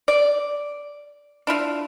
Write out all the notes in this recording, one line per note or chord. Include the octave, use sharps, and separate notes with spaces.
D5
D4 E4 F4